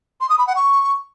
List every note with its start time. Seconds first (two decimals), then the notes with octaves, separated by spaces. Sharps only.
0.21 C6
0.29 D#6
0.38 B5
0.47 F#5
0.56 C#6